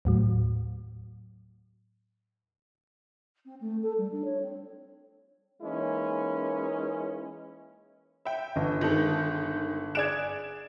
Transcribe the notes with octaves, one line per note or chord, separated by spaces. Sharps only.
D#2 A2 F#3
C4
A3
A4
G3
D4
C#5
C4
E3 G#3 A#3 C#4 D#4 E4
E5 G5
G1 D#5
D#3 G#3 A4
G#4 D5 F#6 G#6 D7 E7